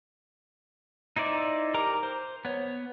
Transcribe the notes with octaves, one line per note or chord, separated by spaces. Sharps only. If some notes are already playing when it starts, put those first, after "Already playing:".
D#4 E4 C5 D5 E5
G4 A#4 A#5 D6
C5
B3 C#5